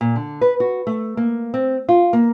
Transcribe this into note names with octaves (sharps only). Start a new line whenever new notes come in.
A#2
D3
B4
F#4
A3
A#3
C4
F4
A#3